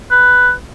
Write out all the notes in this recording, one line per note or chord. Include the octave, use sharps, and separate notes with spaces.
B4